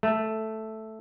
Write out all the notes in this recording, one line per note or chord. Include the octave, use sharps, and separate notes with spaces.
A3